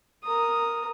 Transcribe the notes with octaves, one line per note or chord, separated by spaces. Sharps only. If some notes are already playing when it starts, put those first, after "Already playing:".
A#4 D#6